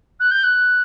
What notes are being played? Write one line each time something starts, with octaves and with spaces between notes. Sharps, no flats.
F#6
G6
F#6